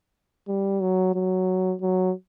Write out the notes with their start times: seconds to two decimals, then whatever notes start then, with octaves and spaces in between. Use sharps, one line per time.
0.48 G3
0.81 F#3
1.14 F#3
1.81 F#3